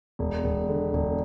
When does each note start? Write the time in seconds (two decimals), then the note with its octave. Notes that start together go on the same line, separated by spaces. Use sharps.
0.19 E1
0.44 E1
0.69 D3
0.93 E1